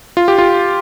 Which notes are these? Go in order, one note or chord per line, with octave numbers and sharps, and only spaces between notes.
F4
G4
F4